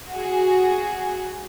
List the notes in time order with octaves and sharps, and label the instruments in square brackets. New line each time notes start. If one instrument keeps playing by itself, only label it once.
[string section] F#4 G#4